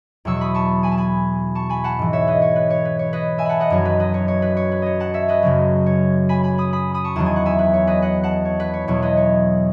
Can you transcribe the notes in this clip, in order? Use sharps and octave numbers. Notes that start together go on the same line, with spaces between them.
E2 B2 F#3 C#6 E6
B5 D#6
A5 C#6
G#5 B5
A5
G#5 B5
A5 C#6
G#5 B5
F#5 A5
G#2 E3
C#5 E5
B4 D#5
C#5
B4
C#5
B4
C#5
B4 D#5
E5 G#5
F#5 A5 B5
D#5 F#5
F#2 D#3 F#3 C#5
B4
B4 D#5
C#5
C#5
B4
C#5
B4
C#5 D#5
F#5 A5
C#5 E5
B4 D#5
F#2 C#3 F#3
C#5
G#5 B5
G#5 B5
B5 D#6
B5 D#6
B5 D#6
A5 C#6
E2 D#3 F#3 A5
G#5
F#5
E5 G#5
B4
C#5
B4 D#5
D#5 F#5
F#5 A5
C#5
B4
C#5
E2 B2 F#3 C#5
B4 D#5
C#5